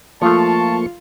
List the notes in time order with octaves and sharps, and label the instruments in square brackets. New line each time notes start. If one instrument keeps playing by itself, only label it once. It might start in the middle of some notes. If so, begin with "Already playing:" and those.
[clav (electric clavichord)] F3 A3 [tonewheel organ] A#3 C#6 [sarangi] F4 [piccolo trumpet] A5